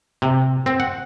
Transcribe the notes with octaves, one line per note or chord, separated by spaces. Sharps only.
C3
C4
F#5